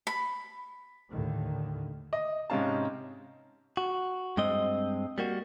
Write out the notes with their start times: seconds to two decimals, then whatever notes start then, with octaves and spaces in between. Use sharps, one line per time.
0.07 B5
1.10 D#2 A2 D3 D#3
2.13 D#5
2.50 G#2 C3 G#3 C#4 F5 A5
3.77 F#4
4.37 G2 G#3 C4 D#5
5.18 G3 A#3 F#4